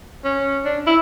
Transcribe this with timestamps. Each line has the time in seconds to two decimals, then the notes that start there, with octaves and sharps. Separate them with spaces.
0.25 C#4
0.65 D4
0.87 E4